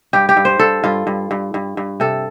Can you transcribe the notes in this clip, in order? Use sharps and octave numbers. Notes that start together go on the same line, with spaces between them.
G2 G4
G4
G2
C5
G2 A4
G2 F4
G2
G2
G2
G2
C3 A4